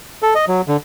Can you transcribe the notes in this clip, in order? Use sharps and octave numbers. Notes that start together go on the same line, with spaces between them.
A4
D#5
F#3
D3